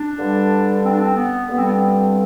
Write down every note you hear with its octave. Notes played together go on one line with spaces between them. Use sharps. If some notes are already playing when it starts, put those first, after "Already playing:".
Already playing: D4
G2 D3 G3
C4
D4
C4
B3
G2 D3 G3 B3
C4
B3
C4